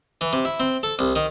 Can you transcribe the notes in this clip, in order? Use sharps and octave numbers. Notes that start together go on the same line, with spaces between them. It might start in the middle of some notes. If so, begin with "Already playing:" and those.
E3
C3
E4
C4
A4
C2
D#3